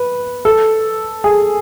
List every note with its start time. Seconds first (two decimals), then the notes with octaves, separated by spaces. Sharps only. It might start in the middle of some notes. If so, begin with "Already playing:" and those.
Already playing: B4
0.45 A4
1.24 G#4